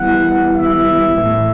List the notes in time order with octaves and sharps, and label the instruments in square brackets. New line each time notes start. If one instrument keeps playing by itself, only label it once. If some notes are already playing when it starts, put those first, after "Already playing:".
Already playing: [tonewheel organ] E3 G3 B3 E4 [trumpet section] F#5
[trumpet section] E5
[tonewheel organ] A2 E3 A3